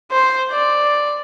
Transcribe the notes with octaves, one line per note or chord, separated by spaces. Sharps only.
C5
D5